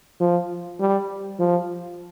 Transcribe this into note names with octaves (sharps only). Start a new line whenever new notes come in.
F3
G3
F3